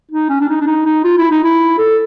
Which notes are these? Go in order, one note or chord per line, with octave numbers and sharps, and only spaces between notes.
D#4
C#4
D4
D#4
D4
D#4
D#4
F4
E4
D#4
E4
A4